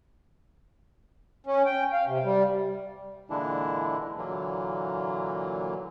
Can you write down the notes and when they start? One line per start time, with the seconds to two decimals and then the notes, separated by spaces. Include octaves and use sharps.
1.46 C#4
1.66 G5
1.93 F5
2.07 C3
2.24 G3
3.30 A#2 D3 E3 G#3 D4 E4
4.17 A#2 D3 E3 F#3 A#3